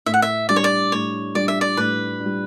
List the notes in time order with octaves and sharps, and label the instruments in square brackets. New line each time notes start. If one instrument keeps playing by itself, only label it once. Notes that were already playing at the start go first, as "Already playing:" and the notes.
[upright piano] A2 [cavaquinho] E5
[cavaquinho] F#5
E5
[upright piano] G3 D4 [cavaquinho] D5
[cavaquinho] C#5
D5
[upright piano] A2 [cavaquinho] C#5
[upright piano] G3 D4 [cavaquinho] D5
[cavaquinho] E5
D5
[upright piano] A2 [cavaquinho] B4
[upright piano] G3 D4